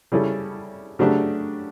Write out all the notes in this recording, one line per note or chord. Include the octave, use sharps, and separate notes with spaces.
C#3 G3 C#4 E4 A4
C#3 F#3 A3 D4 G4